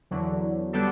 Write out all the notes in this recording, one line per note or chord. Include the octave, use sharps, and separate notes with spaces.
E2 D3 F#3
D3 G3 B3 D4 A4